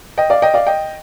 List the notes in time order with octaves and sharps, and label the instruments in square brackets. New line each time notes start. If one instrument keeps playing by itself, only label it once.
[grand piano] D#5 G5
D5 F5
D#5 G5
D5 F5
D#5 G5